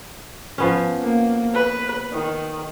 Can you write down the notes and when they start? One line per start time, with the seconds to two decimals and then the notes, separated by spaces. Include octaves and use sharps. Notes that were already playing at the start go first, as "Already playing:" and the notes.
0.58 F3 B3 C#4
1.02 A#3
1.54 B4
2.13 D#3